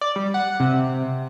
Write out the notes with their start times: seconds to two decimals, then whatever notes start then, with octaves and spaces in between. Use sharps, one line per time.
0.01 D5
0.16 G3
0.34 F#5
0.60 C3